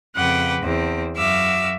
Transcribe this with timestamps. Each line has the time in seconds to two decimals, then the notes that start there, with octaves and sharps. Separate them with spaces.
0.16 F2 C#3 B4 F#5 G5 D6
0.61 E2 C4
1.17 F#2 F#4 E5 F5 D6 E6